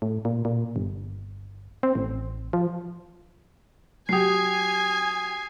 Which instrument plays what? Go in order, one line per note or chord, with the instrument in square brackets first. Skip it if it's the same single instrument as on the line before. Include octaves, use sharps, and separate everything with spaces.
[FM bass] A2
A#2
A#2
G1
C4
A1
F3
[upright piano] F#3 G4 [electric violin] G#5 G#6 [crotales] D#6 C7